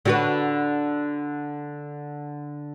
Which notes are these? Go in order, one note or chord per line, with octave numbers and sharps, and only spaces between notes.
D3 F#4 B4